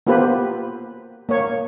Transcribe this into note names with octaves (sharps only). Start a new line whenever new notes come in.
A#3 B3 F4 G4 B4 C5
A#3 C#5